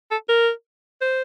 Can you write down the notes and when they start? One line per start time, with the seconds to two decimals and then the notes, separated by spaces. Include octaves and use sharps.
0.11 A4
0.29 A#4
1.01 C5